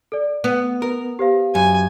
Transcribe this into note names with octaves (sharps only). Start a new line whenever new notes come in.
A4 D5
B3 F#5
A#4
G4 C5 F5
F#2 G#5